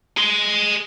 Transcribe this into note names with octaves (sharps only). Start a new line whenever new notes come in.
G#4 C6